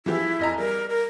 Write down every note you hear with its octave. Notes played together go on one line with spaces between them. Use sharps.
E3 F3 E4 G4
F1 D#5 A#5
G3 A#4
A#4